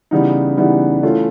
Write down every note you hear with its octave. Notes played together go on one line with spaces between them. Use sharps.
C#3 E3 G3 B3 D#4
C#3 E3 G3 B3 D#4
E3 A3 C#4 F4